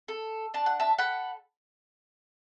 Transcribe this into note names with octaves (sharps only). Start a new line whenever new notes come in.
A4
D4 A5
F#5
E5 A5
A4 F#5 B5